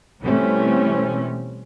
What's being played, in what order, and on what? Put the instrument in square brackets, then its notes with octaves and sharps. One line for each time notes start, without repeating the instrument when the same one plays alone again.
[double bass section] B2 E3 G3 A3 C4 C#4